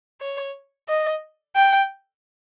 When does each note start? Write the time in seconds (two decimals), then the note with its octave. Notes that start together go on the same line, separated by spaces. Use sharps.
0.21 C#5
0.89 D#5
1.55 G5